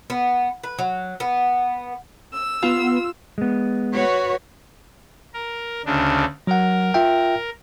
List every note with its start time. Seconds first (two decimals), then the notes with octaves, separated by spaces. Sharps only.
0.10 B3
0.64 B4
0.79 F#3
1.20 B3
2.33 E6
2.63 B3 F4
3.38 G#3 B3
3.92 F#4 B4 C#5
5.34 A#4
5.85 D2 C#3 D4
6.47 F#3 A#4 F#5
6.94 F4 E5 G5